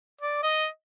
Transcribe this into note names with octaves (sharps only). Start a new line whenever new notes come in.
D5
D#5